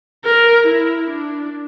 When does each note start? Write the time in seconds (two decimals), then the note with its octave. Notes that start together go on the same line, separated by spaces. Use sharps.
0.25 A#4
0.67 E4
1.10 D4